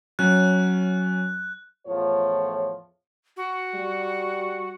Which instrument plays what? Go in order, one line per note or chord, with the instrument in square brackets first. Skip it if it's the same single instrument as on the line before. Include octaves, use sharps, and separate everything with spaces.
[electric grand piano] F#3 C#4 [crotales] F#6
[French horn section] E2 A2 F3 F4 C#5
[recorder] F#4
[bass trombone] G3